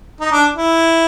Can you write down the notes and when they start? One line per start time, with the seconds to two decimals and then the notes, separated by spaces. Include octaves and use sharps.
0.20 D#4
0.32 D4
0.56 E4